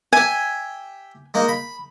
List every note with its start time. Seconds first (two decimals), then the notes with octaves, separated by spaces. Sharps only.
0.13 G4 E5 G#5
1.34 G#3 A#3 D#4
1.48 B5